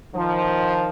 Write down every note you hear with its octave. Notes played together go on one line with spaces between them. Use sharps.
D#3 F3